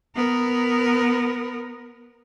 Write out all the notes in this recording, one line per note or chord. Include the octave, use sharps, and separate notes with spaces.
B3 A#4